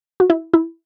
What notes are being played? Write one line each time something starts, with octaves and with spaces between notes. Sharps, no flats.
F#4
E4
E4